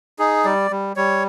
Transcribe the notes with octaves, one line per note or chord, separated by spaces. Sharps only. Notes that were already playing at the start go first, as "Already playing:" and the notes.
D#4 G#4
G3 D5
G3
G3 C#5